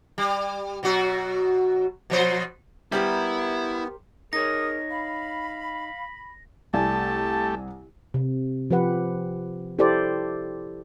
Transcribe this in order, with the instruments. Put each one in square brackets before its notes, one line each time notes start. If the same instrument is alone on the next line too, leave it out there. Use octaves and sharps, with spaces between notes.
[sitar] G3
B2 F#3 F#4
B2 F3 C5
[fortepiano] G3 [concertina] B3 [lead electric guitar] E4 [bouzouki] G4 A#4 C5
[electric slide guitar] D#4 C#5 [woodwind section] G#4 A#4 [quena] D#6 [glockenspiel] A#6
[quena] F5 [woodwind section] B5
[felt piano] C2 D5 G#5 [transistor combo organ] A3 G4 [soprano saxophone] A5
[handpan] C3
F3 G4 B4 F#5
E4 G4 A4 C5 D5